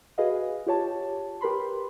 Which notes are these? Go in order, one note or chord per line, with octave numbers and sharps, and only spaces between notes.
F#4 G#4 B4 D#5 F5
F4 G4 C#5 A5
G4 A#4 B4 B5 C6